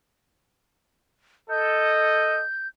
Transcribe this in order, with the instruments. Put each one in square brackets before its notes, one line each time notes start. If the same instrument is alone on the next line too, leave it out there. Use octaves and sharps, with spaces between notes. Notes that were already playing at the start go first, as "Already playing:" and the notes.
[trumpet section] A4 D#5 [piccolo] G6